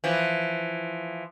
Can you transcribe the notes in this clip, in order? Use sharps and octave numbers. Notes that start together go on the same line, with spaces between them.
E3 F3